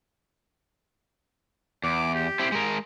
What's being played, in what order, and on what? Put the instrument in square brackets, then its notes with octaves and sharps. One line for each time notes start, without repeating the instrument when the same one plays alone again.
[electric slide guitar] E2 [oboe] D6
[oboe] G4
[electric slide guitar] C4 E4
G#3 A#4